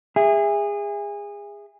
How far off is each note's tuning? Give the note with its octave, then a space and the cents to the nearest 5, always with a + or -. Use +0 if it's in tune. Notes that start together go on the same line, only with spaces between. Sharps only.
G#4 -25 E5 +5